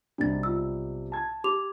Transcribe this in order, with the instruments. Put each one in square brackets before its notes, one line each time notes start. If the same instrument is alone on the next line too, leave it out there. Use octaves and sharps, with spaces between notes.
[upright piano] B1 C3 G3 [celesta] D4 A6
[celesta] F4 E6
[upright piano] A5 G#6
[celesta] G4 D6 F7